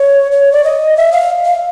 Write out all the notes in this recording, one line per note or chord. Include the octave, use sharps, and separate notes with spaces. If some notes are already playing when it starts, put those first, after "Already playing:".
Already playing: C#5
C#5
D5
D#5
E5
F5
F5